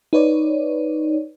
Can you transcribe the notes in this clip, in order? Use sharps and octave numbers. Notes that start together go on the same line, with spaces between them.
D#4 B4 C#5 D5